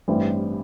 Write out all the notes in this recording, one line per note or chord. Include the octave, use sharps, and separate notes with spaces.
A1 G2 E3 G3 C4